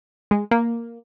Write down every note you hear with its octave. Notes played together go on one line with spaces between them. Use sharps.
G#3
A#3